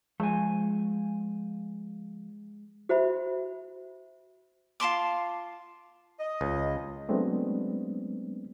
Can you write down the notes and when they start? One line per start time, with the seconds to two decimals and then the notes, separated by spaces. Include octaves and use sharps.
0.20 F3 G#3 C5 G#5
2.89 F#4 C5 E5 B5
4.80 F4 A5 C6 D6
6.19 D#5
6.41 C#2
7.09 F#3 G#3 A3 B3 C4 D4